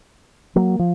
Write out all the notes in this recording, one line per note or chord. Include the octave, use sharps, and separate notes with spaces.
F#3 A#3
F3